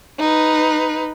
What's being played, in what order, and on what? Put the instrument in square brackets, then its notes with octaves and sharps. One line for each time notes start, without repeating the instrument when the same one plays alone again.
[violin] D#4 B4